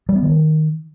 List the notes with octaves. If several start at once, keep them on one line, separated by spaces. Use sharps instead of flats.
G3
B3
D#3